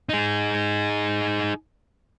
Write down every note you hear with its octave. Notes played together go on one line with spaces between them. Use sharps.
D#4 G#4